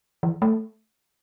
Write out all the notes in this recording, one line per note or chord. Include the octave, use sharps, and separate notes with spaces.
E3
A3